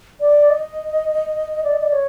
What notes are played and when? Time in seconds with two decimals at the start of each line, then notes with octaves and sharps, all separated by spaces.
0.21 D5
0.50 D#5
1.64 D5
1.74 D#5
1.82 D5
1.92 C#5